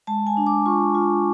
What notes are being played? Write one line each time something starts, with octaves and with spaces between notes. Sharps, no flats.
G#3 A5
G#5
D4
D6
F4 C#6
F4